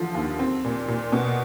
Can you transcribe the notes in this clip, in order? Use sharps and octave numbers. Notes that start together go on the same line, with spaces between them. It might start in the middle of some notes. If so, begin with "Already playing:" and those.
Already playing: D2 D3 F3
D#2
C4
A#2
A#2
B2